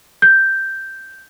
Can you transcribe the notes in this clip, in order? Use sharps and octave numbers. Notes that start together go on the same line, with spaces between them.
G6